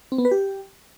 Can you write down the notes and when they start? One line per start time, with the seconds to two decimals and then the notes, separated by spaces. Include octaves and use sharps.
0.12 C4
0.18 B3
0.25 B4
0.31 G4